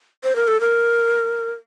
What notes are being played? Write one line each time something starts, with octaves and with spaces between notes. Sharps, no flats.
C5
A#4
A4
A#4